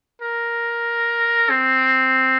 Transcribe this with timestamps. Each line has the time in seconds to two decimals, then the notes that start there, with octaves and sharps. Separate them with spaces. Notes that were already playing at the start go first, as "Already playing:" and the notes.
0.22 A#4
1.50 C4